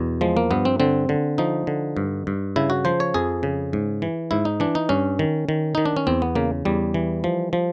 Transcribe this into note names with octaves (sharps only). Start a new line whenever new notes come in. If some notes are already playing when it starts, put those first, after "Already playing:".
Already playing: E2 B2
F3 G#3
A#3
G2 B3
C4
D3 C4
D3
F3 D#4
D3
G2
G2
C#3 E4
F#4
F3 C5
C#5
F2 G#4
C#3
G#2
E3
G#2 E4
D#4
E3 D4
D#4
G2 C#4
D#3
D#3
D#3 D#4
D4
C#4
E2 C4
B3
C#3 A#3
E2 G3
E3
F3
F3